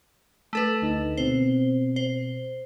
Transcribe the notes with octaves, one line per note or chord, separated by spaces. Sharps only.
A3 A4 B4
D2 D#4 E6
B2 C4 C5
C5